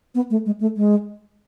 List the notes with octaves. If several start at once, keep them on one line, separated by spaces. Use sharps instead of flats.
B3
A3
G#3
A3
G#3